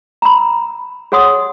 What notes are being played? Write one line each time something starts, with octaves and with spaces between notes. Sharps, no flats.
A#5 B5
G#4 C#5 F#5 C6 D#6